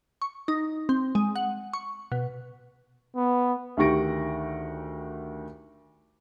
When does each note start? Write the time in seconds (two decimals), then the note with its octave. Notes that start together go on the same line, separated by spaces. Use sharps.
0.22 C#6
0.48 D#4
0.89 C4
1.15 G#3
1.36 F#5
1.73 C#6
2.12 B2
3.16 B3
3.77 D2 D#3 G4 C#6 A#6 D7